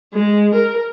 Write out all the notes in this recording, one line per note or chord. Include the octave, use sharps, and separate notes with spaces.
G#3
A#4